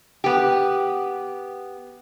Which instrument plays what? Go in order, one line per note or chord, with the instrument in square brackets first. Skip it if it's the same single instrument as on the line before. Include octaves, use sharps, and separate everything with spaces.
[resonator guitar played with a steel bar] B3 G4